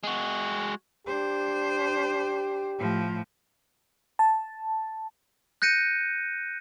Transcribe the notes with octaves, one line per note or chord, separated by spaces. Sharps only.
G#3 F#4
D4 G4 C5
A2 F3
A5
F#6 G6 A#6 C#7 D#7